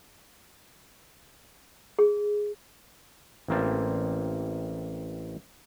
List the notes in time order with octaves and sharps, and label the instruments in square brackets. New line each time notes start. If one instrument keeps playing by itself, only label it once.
[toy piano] G#4
[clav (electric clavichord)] A1 A#3 C4 A5